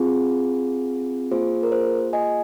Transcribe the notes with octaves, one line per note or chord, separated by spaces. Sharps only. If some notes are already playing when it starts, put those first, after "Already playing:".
Already playing: C4 F4 G#4
A#3 F4 G#4 C5
A#4
C5
D#5 G#5